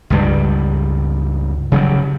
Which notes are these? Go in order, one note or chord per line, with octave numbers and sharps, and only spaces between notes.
C#2 G2 G3
C#3 F#3 G3